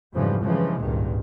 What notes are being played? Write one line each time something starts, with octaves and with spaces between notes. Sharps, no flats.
F2 G#2 C#3 E3 F3 G3
G2 C#3 E3 F3 G#3
G#1 C#2 G2 A#2 D#3